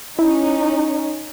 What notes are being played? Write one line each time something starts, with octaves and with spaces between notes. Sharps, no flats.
C#4 D#4 E4